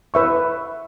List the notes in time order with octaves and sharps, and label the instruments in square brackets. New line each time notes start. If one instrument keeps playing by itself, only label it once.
[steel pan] B4 E5 C#6